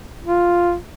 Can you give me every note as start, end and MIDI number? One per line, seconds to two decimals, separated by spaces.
0.24 0.75 65